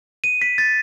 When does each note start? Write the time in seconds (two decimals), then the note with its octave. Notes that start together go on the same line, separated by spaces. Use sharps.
0.24 D#7
0.42 B6
0.58 A6